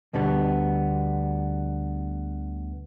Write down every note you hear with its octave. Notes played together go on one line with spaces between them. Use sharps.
D2 B2 D3 G3 B3